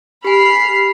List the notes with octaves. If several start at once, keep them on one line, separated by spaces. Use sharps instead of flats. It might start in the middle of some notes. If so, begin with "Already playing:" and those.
G4 G#5 B5 F6 C7